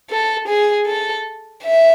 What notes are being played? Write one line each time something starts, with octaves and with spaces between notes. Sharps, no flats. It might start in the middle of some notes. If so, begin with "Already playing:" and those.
A4
G#4
A4
E5